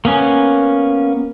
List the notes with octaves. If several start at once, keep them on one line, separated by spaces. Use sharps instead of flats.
A#3 B3 C#4